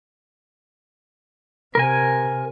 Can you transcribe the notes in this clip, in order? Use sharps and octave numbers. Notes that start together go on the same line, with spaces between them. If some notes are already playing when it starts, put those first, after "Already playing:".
C3 A#4 G#5